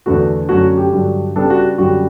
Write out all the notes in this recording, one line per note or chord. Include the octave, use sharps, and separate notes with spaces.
E2 D3 A3 F#4
F#2 D3 A3 C#4 F#4
F#4
G4
G2 D3 F#3
C#3 G3 B3 D4 A4
F#4
F#2 D3 G3 C#4 F#4